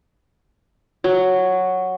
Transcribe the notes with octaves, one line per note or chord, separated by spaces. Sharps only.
F#3